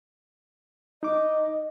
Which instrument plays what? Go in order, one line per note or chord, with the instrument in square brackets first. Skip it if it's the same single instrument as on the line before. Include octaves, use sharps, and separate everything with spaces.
[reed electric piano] D#4 D6 [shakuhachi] D#5